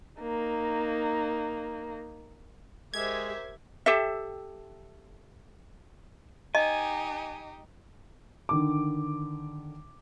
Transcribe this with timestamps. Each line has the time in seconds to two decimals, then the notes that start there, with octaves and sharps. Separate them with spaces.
0.21 A#3 D#4
2.94 G#3 G4 A#4 C5 E5 G#6
3.86 G4 A4 E5
6.55 D#4 G4 D#5 G#5
8.49 D3 D#3 D6